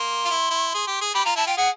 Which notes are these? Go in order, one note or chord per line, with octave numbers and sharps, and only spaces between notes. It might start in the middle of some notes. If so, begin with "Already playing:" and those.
Already playing: A#3 C6
F4
E4
E4
G#4
G4
G#4
G4 B5
F4 A#5
E4 A5
F4 G5
G#4 F#5